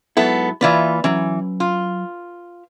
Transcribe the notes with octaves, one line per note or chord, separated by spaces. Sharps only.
G#2 F#3 B3 E4 A4
E3 A#3 F4 B4 D5 E5
E3 F#3 C#4
F4